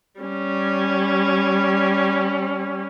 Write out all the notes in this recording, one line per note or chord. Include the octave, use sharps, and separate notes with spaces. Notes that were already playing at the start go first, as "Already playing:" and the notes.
G3 C#4